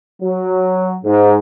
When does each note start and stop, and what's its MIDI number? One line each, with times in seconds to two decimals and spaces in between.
0.22 0.96 54
1.04 1.37 44